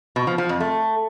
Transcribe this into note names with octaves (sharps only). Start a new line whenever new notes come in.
B2
F3
F3
F2
A3